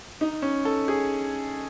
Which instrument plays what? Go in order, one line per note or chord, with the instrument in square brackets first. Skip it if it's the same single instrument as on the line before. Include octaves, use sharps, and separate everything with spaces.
[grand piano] D#4
C#4
A4
G#4